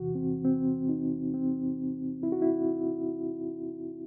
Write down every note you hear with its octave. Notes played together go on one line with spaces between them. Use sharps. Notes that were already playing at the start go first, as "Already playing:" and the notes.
Already playing: E2 C3 E3 F#4
C4
C4
D#4
C4
E4
F#4
E4